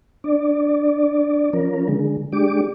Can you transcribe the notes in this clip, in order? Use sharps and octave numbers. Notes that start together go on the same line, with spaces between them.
D4 D5
F3 C#4 A#4
D3 G#3
G#3 D4 G4 D6